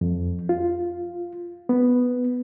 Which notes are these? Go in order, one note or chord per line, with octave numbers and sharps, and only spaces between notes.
F2
F4
B3